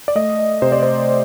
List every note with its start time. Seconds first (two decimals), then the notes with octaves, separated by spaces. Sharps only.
0.08 D5
0.15 A3 D#5
0.62 C3 C5
0.72 D5
0.83 C5